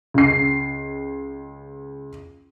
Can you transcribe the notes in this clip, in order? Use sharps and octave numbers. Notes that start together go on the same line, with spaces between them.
C#2 C7